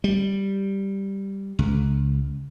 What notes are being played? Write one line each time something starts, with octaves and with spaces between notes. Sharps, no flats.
G3
C#2